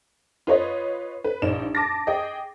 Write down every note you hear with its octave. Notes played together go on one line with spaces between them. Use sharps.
F4 B4 C#5 D#5
B4
A#1 D#4 E7
A5 D6 A6 A#6
G#4 D#5 G5